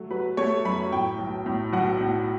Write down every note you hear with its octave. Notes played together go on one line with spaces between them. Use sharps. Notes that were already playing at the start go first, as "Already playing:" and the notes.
Already playing: F#3 A3
F#3 B4
A3 C#5
F#2 B5
A2 G5
B1
A2
B1 F#5
A2